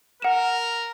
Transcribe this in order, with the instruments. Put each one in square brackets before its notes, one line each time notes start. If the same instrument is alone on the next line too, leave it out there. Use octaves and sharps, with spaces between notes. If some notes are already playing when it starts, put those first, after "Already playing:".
[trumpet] A#4 [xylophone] F#5 E7